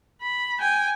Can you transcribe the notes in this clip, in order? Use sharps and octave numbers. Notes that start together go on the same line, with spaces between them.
B5
G5 G#5